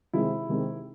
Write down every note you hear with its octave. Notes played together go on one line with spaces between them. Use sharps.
C3 D#3 G#3 C4 E4
C3 D#3 G#3 C4